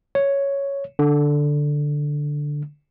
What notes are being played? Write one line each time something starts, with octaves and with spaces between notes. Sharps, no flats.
C#5
D3